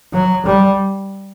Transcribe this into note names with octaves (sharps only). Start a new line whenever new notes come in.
F#3
G3